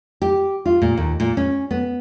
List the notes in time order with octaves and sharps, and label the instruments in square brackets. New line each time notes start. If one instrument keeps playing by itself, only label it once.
[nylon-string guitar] G4
F4
A#2
D#2
A#2
C#4
B3